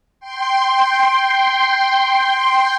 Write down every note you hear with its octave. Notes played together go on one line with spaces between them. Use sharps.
G5 C6